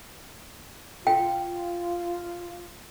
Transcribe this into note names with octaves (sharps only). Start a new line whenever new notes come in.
F4 G5